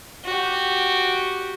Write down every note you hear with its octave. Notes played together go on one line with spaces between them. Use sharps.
F#4 G4